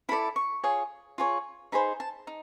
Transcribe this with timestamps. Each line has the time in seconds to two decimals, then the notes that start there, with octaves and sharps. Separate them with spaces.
0.09 E4 A4 D5 B5
0.36 C#6
0.64 F4 G#4 C#5
1.18 F4 G#4 C#5
1.72 D#4 G#4 C5 B5
2.00 A5
2.27 D#4